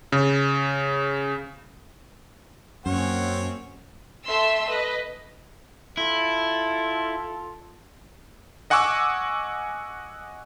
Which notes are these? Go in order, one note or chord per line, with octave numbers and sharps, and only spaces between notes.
C#3
F#2 A#3 C4 C#4 C#5 F#5
A3 E5 C6 E6
B4 D#5
E4 F4 A4
D#5 F#5 G#5 C#6 D6 E6